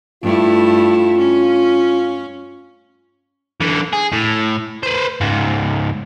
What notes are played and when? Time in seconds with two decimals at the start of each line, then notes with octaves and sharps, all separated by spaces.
0.23 G2 A3 E4 F4
1.19 C#4
3.61 D3 E3
3.93 G#4
4.13 A2
4.83 B4 C5
5.21 C#2 G#2